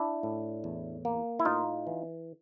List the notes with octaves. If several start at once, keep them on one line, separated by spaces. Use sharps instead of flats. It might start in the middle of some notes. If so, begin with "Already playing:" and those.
Already playing: D4 E4
A2
E2
A#3
E4
A2 D#4 F4
E3